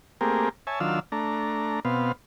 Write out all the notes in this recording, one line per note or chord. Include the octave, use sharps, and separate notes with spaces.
A3 A#3 C4 G4 G#4 A#4
C#5 E5 G#5 A5
D#3 F#3 D4 F4 F5 E6
A3 D4 A#5
B2 B3 C4 F5